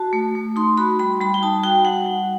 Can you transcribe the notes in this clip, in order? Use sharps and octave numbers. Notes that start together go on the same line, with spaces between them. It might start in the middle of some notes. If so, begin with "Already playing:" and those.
Already playing: F#4 A5
A3
A3
D#4 C6
F#4 B5
G3 B5
G3 B5
G5
D#4 A5
F#4 G5
G3 F#5
G3